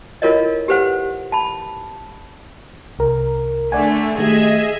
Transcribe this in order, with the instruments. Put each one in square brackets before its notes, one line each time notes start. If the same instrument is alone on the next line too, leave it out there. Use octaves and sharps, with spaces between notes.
[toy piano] E4 F4 A4 A#4 C#5 D#5
G4 A4 B4 C5 F#5
A5 B5
[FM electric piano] C2 A#4
[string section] D3 A3 [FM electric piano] D5 F#5 G#5
[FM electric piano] D#3 A3 G4 [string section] G#4 D#5 E5